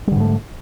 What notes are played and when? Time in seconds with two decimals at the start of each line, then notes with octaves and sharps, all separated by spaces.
0.07 G3
0.12 D3
0.16 G#2
0.20 A3